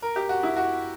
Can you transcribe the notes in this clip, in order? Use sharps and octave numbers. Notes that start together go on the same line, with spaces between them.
A#4
G4
F#4
E4
F#4